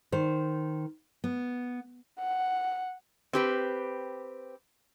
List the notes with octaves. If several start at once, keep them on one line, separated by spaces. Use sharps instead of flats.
D#3 C5
B3
F#5
C4 G4 B4